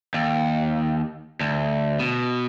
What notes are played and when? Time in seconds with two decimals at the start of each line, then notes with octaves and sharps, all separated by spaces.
0.14 D#2
1.41 D2
1.99 B2